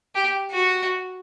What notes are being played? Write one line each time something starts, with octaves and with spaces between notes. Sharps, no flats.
G4
F#4